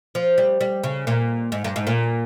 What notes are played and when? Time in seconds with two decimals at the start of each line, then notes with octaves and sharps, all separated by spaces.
0.15 F3
0.38 G3
0.61 G3
0.84 C#3
1.07 A#2
1.52 G#2
1.64 G2
1.76 G#2
1.87 A#2